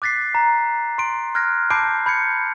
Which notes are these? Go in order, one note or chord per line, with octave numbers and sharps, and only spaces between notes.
D6 F#6 A6 B6 C7
A#5
C6 D7
F6 F#6 G#6 A#6
A5 B5 D6 G6 C7 D7
B5 G6 G#6 C#7